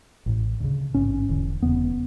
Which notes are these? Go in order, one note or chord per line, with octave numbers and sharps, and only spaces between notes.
A1 A2
D2 C#3
A1 G#2 C#4
E1 E2 D3
E1 E2 C#3 B3